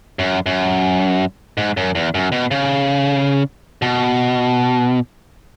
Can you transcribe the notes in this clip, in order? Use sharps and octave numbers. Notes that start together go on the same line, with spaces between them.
F#2
F#2
G#2
F#2
E2
F#2
B2
C#3
B2